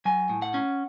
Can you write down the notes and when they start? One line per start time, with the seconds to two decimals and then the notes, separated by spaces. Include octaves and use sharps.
0.05 F#3 G#5
0.29 A2
0.42 F#5
0.54 C#4